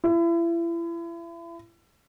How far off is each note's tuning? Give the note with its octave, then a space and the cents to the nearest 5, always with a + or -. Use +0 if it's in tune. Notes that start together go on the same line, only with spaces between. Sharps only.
E4 +35